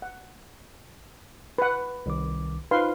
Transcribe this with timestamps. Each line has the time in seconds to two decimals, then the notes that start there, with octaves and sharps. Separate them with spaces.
0.02 F#5
1.58 B4 F#5
2.06 C2 D#3 D6
2.71 D#4 F4 B4 C5 F5 C6